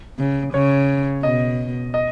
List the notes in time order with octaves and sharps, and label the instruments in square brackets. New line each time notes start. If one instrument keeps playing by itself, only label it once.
[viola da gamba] C#3
[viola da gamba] C#3 [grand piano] C#5
[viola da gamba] B2 [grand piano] D#5
[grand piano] D#5